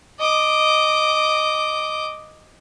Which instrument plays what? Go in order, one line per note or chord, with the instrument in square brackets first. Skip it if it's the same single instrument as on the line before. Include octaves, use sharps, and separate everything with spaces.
[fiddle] D#5 D6